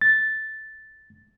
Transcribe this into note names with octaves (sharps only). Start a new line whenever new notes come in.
A6